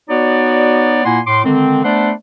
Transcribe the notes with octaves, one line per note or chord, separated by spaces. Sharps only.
B3 D#4 F#4 C#5 D5
A#2 A#3 E4 F#5 G#5 C6
A2 C6 D6
D3 D#3 G#3 C4
A3 B3 D4 C5 D5 F#5